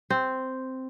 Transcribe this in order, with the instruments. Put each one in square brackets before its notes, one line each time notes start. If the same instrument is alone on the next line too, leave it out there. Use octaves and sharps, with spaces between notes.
[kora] C4